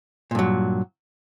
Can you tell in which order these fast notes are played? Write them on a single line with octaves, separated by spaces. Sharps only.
A#2 G2 F#3